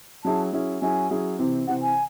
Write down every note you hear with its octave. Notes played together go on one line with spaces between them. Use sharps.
F#3 C#4 E4 G#4 A5
F#3 C#4 E4 G#4
F#3 C#4 E4 G#4 G#5
F#3 C#4 E4 G#4
C3 E3 C4
C3 E3 C4 F#5
G#5